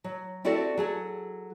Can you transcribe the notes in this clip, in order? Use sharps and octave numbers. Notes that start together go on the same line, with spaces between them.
F#3
C4 E4 F#4 G4 A4 D5
F#3 G#4 A4